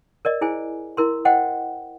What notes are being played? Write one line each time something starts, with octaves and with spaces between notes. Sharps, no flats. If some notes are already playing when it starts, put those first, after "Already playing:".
A#4 D5 D#5
E4 G#4 C5 G#5
E4 A#4 C6
C5 D#5 F#5 G5